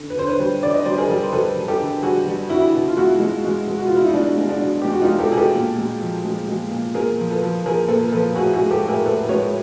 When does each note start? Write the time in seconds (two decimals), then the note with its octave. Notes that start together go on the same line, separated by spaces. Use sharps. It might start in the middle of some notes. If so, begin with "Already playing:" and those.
Already playing: D3
0.10 B4
0.16 D3 C5
0.27 B4 C#5
0.40 G3
0.63 D3 D5
0.74 D#5
0.85 G3 C5 D5
0.98 G#4 A#4
1.09 G3
1.23 C5
1.33 G3 A4 B4
1.57 G3
1.68 G4 A4
1.80 D3
2.03 G3 F#4 G#4
2.26 G3
2.50 D3 E4 F#4
2.74 B2
2.88 F4
2.97 G#3 E4 F#4
3.20 G#3
3.44 G#3
3.67 G#3
3.78 F#4
3.87 B2 F4
3.96 E4
4.05 D#4
4.13 G#3 D4
4.38 G#3
4.49 D4
4.61 B2
4.82 G#3 G4
4.92 F#4
5.02 D#4 F4
5.08 G#3
5.19 G4 A4
5.32 B2 G#4
5.37 G4 A4
5.55 A#2
5.78 G#3
6.01 F3
6.25 G#3
6.48 G#3
6.71 A#2
6.94 A#2 G#4 A#4
7.18 F3
7.30 A4 B4
7.42 F3
7.66 F3 G#4 A#4
7.88 A#2 A4 B4
8.12 F3 A4 B4
8.35 A2 F#4 G#4
8.53 F#4 G#4
8.60 G#3
8.71 G4 A4
8.83 A2
8.88 G#4 A#4
9.06 A2 A4 B4
9.29 G#3 B4 C#5